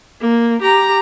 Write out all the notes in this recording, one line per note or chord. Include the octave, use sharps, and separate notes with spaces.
A#3
G4 A#5